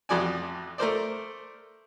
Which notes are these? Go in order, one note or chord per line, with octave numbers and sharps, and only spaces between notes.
A1 F2 F#4 D5 G#5
A3 A#4 C5 D5